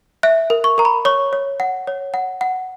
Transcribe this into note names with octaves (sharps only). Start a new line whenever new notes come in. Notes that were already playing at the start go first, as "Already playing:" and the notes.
E5 F#6
A#4
C#6
A#4 A#5
B5
C#5 C#6
C#5
F#5
C#5
F#5
F#5